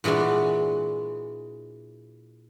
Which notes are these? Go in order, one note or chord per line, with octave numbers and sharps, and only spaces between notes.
A#2 E3 G#3 D4 F#4